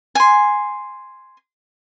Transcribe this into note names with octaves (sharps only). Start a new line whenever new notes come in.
G#5 C6